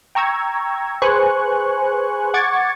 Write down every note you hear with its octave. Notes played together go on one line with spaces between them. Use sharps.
G5 A#5 C#6 E6 G#6
G#4 B4 C5 G#5 C#6 F#6
F#5 C#6 D6 G#6 A6 C#7